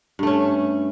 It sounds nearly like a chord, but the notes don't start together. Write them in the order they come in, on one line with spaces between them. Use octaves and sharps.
G2 A3 C#4